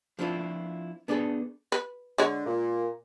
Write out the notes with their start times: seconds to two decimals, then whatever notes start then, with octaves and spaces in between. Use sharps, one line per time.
0.19 F3 C4 D4 E4 F4
1.08 B3 D4 F#4 G#4 A4
1.72 B4
2.18 D3 G#3 C#5
2.46 A#2